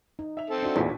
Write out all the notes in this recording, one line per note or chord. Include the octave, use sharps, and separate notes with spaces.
D#4
E5 F7
C4 A4
D4 F#4
A1 E2 A#2 B6